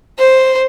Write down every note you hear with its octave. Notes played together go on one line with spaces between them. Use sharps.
C5